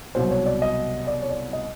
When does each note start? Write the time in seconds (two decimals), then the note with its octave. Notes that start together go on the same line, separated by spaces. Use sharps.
0.15 C2 B2 F#3 C5
0.31 C#5
0.46 D5
0.62 D#5
1.07 D5
1.22 C#5
1.30 D5
1.53 D#5